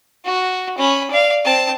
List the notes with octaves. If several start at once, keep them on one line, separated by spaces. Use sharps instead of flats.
F#4
C#4 B5
D5 F5
C4 A5